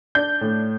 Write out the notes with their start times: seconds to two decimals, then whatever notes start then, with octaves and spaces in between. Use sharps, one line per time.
0.15 D4 G6
0.41 A2